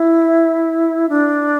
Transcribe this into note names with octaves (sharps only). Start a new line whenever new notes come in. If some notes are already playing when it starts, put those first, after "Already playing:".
Already playing: E4
D4